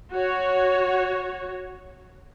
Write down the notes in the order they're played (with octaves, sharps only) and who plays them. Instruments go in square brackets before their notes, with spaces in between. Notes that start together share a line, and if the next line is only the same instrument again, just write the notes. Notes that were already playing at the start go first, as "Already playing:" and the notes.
[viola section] F#4 C#5